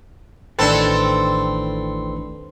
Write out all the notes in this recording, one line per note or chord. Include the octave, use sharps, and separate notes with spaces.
A1 A2 D#3 C4 D4 A4 B4